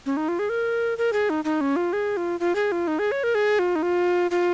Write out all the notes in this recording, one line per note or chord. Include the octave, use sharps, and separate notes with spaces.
C#4
D#4
F4
G#4
A#4
A#4
G#4
D#4
D#4
C#4
F4
G#4
F4
F4
G#4
F4
D#4
G#4
C#5
A#4
G#4
F4
D#4
F4
F4